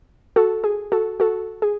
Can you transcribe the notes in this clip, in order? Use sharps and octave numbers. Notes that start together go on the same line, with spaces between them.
F#4 A4
G#4
F#4 A4
F#4 A4
G#4